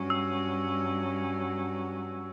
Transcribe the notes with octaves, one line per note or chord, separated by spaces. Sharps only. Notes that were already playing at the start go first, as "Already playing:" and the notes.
Already playing: G2 F#3 C#4
E6